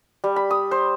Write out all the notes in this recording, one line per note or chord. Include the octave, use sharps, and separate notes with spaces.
G3
B5
D#6
C5